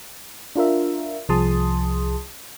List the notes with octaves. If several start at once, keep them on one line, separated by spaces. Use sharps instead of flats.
D4 F4 A#4 E5
C2 F3 G#4 A5 C6 D#6